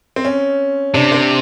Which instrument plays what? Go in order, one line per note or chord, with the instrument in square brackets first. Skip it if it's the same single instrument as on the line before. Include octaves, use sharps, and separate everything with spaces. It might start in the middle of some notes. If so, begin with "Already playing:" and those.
[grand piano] C4
C#4
[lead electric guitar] C3 [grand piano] D4
[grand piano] C4